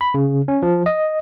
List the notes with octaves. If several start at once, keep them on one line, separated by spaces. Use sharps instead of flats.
B5
C#3
C#4
F3
D#5